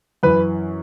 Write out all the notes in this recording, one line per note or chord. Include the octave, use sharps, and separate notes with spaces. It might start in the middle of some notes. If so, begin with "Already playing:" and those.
F#2 E3 B4